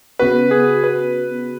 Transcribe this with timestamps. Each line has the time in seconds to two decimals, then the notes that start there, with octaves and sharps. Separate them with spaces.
0.19 C#3 B3 F#4 B4
0.51 G#4
0.84 B4